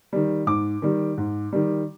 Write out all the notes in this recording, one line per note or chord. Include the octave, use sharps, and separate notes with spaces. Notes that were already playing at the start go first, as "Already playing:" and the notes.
D#3 G3
G#2 D6
D#3 G3
G#2
D#3 G3